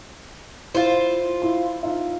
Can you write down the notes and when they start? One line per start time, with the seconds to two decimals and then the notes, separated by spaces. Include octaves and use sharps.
0.75 E4 F4 C5
1.42 E4 C6
1.83 D#4 F4 E5